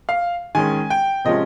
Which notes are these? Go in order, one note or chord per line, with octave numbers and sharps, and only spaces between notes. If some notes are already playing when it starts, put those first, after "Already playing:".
F5
D#3 G#3 C#4 G#5
G5
C3 F3 G#3 C#4 D#5